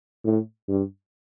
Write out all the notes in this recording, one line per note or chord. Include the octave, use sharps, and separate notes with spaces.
A2
G2